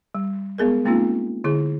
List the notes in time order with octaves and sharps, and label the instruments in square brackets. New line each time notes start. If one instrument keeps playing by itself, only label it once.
[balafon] G3
G#3 B3 G#4 A#4
G#3 A#3 C4 C#4 D#4 F4
D3 E4 G#4